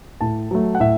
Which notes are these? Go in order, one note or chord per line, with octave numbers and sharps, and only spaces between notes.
A2 A5
F#3 A3
F#5
A2 E5